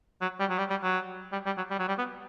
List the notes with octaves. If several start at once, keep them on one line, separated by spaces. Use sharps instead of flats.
F#3
G3
F#3
G3
G3
F#3
G3
G3
F#3
G3
F#3
G3
B3